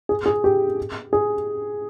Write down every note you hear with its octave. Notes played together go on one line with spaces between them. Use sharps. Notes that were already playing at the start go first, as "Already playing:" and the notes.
G#4
G#4
G4
G#4